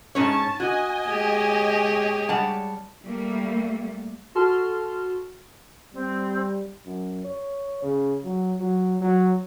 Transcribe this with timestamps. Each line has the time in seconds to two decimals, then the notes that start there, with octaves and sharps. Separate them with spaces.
0.15 G#2 C#4 C#5 A5
0.60 F#4 D#5 G#5
1.08 G#3 G4 C#5
2.29 G3 F#5 A5
3.03 G3 A3 A#3
4.35 F#4 A4 A5 C6 F6
5.94 G3 C4
6.86 F#2
7.24 C#5
7.82 C#3
8.24 F#3
8.60 F#3
9.01 F#3